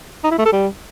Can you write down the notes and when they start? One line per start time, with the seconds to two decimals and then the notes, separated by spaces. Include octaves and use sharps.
0.24 D#4
0.31 E4
0.38 A3
0.45 A4
0.52 G3